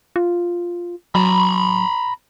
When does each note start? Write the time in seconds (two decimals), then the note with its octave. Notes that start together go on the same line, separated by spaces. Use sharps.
0.16 F4
1.15 F#3 A#5 B5